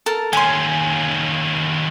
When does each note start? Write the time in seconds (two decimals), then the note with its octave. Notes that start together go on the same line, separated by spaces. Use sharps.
0.06 A4 A#4 A5
0.33 D#2 C#4 G#5 C6